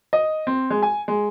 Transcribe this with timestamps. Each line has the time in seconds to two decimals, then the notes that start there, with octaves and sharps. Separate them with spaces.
0.13 D#5
0.47 C4
0.70 G#3
0.83 G#5
1.08 G#3